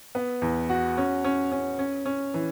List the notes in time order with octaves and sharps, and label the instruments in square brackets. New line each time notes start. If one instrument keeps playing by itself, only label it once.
[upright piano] B3
E2
F#4
C#4
C#4
C#4
C#4
C#4
E3